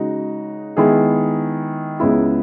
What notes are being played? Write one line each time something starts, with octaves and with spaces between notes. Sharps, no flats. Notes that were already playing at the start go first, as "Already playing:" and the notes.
Already playing: C#3 G#3 D#4 F#4
D#3 G#3 B3 E4 G#4
C#2 C#3 G#3 B3 E4